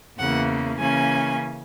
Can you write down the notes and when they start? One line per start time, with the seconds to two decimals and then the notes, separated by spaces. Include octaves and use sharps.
0.18 E2 C#3 E3 A#3 F#5
0.79 C#3 E3 A#3 C#4 G#5